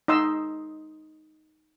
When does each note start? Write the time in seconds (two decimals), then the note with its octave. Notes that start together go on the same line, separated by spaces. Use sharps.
0.08 D#4 D#5 C6 E6